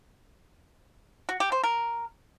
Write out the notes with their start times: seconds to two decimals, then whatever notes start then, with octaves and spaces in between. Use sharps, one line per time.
1.29 F#4
1.40 G4
1.52 C5
1.64 A#4